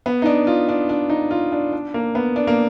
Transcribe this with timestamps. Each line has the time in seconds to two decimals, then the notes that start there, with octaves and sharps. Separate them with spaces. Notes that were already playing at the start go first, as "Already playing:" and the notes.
0.06 B3
0.22 D#4
0.26 D4
0.47 F4
0.69 D4
0.89 D4
1.10 D#4
1.31 F4
1.52 D4
1.73 D4
1.94 A#3
2.15 B3
2.36 D4
2.47 A#3